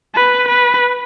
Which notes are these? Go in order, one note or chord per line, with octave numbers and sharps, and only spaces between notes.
B4
B4